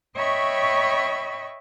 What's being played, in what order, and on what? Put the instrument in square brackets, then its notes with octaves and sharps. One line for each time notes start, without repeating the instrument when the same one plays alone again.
[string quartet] C#5 D#5 E5 G5 B5 C#6